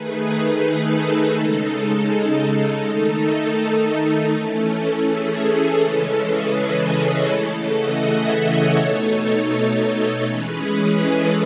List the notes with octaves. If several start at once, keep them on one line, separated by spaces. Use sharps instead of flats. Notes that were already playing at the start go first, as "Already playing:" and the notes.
Already playing: D#3 A3 D#4 G#4 B4
G#4
A4
C#3 G#3 D#4
A4
D#3 A3 D#4 A4
A4
E3 A3 C#4
G#4
C#3 E3 G#3 C#4 A4
G#4 B4
B4 D#5
A4 C#5
C#3 E3 A3 A4
D#5 F#5
E5 G#5
A4 C#5
B2 A3 D#4
E3 G#3 C#4 G#4 B4
A4